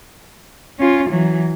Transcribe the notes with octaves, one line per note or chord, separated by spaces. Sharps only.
C#4 F4
E3 F#3